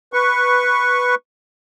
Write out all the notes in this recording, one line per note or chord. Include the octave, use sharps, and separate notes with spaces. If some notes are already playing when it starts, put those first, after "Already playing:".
B4 C#6